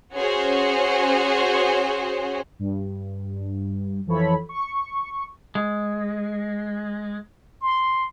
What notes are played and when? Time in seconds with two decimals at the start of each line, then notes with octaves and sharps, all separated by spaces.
0.15 C#4 F#4 G#4 C5 C#5
2.59 G2
4.06 F2 E3 F3 A4 C#5 B5
4.49 C#6
5.55 G#3
7.61 C6